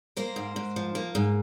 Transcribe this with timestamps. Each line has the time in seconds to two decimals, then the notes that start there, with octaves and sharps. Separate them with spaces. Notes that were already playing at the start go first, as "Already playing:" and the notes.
0.17 A#3 A#4 C5
0.36 G#2
0.56 G#2
0.76 F3
0.95 A#3
1.15 G#2